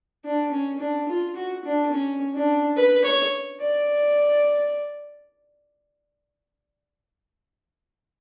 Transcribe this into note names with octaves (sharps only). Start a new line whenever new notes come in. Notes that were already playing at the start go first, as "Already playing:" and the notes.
D4
C#4
D4
F4
F#4
D4
C#4
D4
B4
C#5
D5